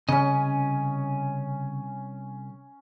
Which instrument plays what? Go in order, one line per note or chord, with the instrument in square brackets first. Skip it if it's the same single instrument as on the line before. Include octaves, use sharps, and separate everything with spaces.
[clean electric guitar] C2 G2 D#5 [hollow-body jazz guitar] C#3 [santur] C#4 G#5